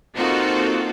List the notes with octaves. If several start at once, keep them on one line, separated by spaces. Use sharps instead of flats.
A#3 C4 D#4 F4 F#4 A4